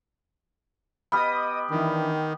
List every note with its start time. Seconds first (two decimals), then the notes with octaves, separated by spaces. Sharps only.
1.12 B3 G4 D#5 B5 D#6 F6
1.70 D#3 E3 D4